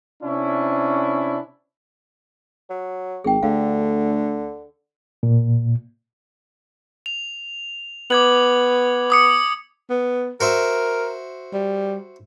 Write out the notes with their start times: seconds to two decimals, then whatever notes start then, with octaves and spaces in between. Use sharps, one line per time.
0.23 C3 C#4 D4 E4
2.70 F#3
3.24 G#1 G#4 G5
3.43 D2 D3 F5
5.23 A#2
7.06 F7
8.10 B3 D6 G#6 F#7
9.10 D6 D#6 C#7
9.90 B3
10.41 F#4 A#4 C5 E5
11.53 G3